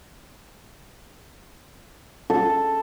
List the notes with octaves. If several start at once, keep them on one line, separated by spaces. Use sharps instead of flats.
A4